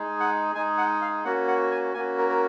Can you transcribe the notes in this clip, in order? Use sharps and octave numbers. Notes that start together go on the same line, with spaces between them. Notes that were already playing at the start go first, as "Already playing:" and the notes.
Already playing: G#3 D#4 G#4
F#5
G#3 D#4 G#4 G#5
F#5
F5
A#3 C#4 F#4 F#5
F#5
G#5
A#3 C#4 F#4 G#5
A#4
A#4